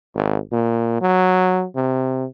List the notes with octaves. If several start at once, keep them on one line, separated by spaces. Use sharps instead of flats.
G#1
A#2
F#3
C3